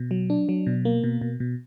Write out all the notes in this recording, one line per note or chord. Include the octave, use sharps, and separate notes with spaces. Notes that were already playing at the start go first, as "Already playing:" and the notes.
Already playing: B2
F#3
D4
F#3
B2
A#3
B2
B2
B2